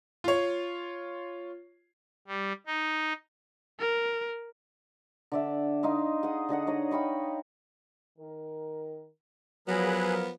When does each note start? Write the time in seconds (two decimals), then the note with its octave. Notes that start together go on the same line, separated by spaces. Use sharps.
0.24 F4 C#5
2.27 G3
2.66 D#4
3.80 A#4
5.32 D3 D5 E5
5.83 D#4 D#5 F5 C6
6.23 G#4 F#5
6.49 D3 G#4 D#5 F#5
6.67 D#4 C#5 D#5
6.91 F5 G5 B5 C#6
8.18 D#3 A#4
9.68 F3 F#3 B3 G#4 A#4 B4 B5